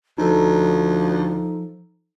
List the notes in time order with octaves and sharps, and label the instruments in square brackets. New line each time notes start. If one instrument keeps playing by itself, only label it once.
[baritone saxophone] D2 [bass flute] F3 [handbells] D#4 A4